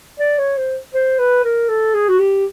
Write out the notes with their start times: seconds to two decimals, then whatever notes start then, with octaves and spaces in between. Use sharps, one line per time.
0.19 D5
0.38 C#5
0.57 C5
0.94 C5
1.19 B4
1.44 A#4
1.69 A4
1.94 G#4
2.09 F#4
2.19 G4